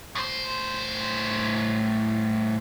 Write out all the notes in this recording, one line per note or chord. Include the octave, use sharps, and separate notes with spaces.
A2 C5